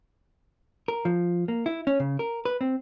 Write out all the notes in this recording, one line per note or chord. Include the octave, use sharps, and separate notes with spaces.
A#4
F3
A#3
E4
C#4
C#3
A#4
B4
C4